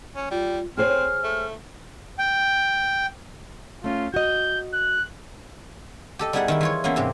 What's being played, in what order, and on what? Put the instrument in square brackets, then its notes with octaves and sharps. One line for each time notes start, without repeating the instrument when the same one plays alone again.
[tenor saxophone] C#4
[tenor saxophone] G3 [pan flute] F4
[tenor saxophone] C4 [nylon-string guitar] G#4 C5 C#5 [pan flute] F6
[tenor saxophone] A3
[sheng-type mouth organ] G5
[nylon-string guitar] A3 C#4 [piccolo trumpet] F4
[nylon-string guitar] F#4 D#5 [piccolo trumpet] G6
[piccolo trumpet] F#6
[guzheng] G4 A4 D#5
G3 B3 D#4 E4 G#4 F#5
D#3 E4 A#4
E3 F4 C#5
E3 A#3 B3 C#4
G#2 C3 G4